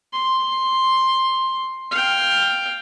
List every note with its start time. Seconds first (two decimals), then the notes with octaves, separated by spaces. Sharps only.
0.13 C6
1.92 F5 G5